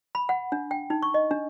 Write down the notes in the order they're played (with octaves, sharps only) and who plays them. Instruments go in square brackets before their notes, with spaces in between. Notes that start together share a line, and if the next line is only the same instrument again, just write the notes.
[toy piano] B5
F#5
D4
G5
D#4
C#6
D#5
D4